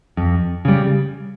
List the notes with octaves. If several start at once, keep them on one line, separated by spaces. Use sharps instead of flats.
F2
C#3 G3